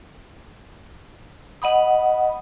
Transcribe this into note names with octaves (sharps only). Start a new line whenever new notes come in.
D#5 F#5 B5 D#6